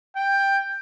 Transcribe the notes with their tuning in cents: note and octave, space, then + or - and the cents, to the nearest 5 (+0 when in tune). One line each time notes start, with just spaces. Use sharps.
G5 +10